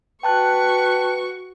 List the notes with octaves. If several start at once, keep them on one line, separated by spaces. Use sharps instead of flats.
F#4 B4 G5 A5 C#6 F#6